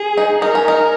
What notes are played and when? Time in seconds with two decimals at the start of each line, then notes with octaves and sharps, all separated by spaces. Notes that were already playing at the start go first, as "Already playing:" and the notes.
Already playing: G#4
0.17 D#4
0.42 D#4 A#4
0.55 C#4
0.68 D#4